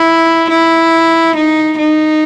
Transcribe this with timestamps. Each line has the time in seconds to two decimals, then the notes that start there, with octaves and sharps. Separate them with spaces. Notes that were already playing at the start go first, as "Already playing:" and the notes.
Already playing: E4
0.50 E4
1.36 D#4
1.79 D#4